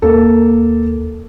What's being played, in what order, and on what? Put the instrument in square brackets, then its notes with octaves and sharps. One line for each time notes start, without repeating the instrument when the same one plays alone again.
[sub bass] D#2 [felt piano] A#3 A4